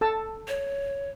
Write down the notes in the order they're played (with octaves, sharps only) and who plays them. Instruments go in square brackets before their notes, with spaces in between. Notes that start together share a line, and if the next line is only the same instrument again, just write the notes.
[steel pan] A4 A5 E6
[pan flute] C#5